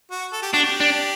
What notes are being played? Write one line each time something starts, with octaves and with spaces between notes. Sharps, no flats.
F#4
A4
G4
D4 F#4
G4
D4